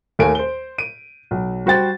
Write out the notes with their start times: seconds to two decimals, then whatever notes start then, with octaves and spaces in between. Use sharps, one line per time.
0.19 D#2 A3 A#4 G#5 D7
0.35 C5 G7
0.78 D7 D#7
1.31 B1
1.66 G3 F#4 C5 G5 A6